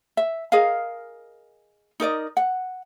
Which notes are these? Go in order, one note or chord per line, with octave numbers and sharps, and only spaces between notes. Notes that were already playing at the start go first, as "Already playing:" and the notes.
E5
G#4 A#4 D#5 F5
D#4 A#4 D5 D#5
F#5